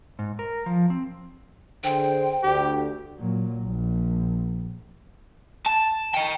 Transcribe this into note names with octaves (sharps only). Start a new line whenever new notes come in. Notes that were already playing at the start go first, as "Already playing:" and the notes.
G#2
A#4
F3
C4
D3 G#4 C5 G5
D2 G4
A#2 F#3
A#1
A5
D#5 G5